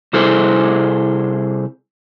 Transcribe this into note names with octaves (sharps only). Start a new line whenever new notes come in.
C3 G3 E4 G#4 A4 C5